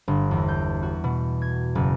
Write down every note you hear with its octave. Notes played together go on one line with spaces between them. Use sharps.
G1
E2
G6
F#4
B2
G#6
F#1